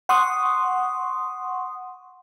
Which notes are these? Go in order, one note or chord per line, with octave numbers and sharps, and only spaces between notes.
F#5 C6 C#6 D#6